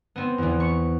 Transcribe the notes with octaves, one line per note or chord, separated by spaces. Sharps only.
B3 C4
E2 E3
C#6